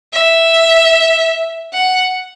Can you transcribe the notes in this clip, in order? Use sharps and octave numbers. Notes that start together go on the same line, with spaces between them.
E5
F#5